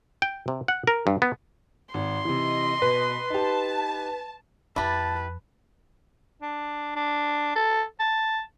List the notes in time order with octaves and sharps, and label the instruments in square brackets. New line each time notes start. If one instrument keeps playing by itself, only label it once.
[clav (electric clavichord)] G5
C3
F#5
A#4
G2
B3
[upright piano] G#1 [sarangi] C6
[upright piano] C3 E3 [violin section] D#5
[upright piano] B2 [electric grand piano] B4
[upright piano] D#4 G4 [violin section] A5
[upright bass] F2 [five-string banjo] E4 G4 [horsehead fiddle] B4 [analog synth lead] A5
[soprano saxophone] D4
D4
A4
A5